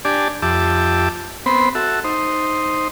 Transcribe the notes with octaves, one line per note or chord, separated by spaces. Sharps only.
D4 G4 D5 G#5 A5
F2 G4 E5 A5 D6
B3 C4 C5 B5
F#4 A4 E5
D#4 C5